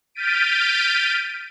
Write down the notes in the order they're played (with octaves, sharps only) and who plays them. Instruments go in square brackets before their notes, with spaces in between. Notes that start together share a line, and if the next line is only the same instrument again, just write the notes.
[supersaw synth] F6 G6 A6 B6 D7 D#7